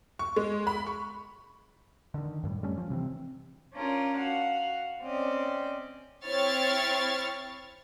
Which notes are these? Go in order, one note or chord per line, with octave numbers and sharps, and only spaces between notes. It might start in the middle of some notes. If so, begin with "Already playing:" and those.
C#6
G#3
B5
C#6
D3 D#3
F#2 A2 G3
G3 A3 C#4
F3
C3 E3 C4
C#4 D4 F4 A#4 D5
F#4 F5 F#5
C4 C#4 D5 D#5
C4 E4 C#5 C#6 F6 A6